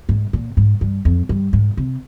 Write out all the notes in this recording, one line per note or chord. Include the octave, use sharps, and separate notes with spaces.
G#2
A#2
G#2
G2
F2
G2
G#2
C3